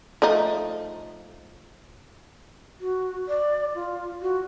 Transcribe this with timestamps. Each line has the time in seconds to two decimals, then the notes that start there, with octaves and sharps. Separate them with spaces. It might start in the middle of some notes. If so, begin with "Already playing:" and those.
0.22 F3 A3 D#4
2.80 F#4
3.28 D5
3.75 F4
4.22 F#4